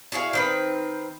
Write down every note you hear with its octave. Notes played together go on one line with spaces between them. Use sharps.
E4 F#4 G#4 F5
D#3 C4 B4